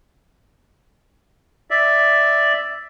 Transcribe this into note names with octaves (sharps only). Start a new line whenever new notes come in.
D5 E5